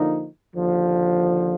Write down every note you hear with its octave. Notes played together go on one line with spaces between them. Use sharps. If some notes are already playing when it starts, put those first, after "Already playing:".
Already playing: D3 F3 A#3 D#4
D#2 D3 F3